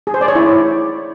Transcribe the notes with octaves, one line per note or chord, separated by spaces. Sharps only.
G#4
C5
D5
C#5
E4